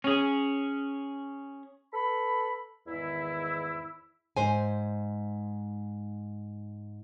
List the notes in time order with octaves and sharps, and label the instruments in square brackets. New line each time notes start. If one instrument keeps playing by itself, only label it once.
[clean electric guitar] C#4 G#4
[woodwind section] A4 B4 B5
E2 G#2 D#3 E4
[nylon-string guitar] G#2 C5 G#5